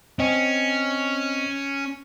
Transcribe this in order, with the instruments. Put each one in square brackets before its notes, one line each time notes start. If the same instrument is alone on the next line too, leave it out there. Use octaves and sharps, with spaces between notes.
[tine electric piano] C4 D#5 [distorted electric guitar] C#4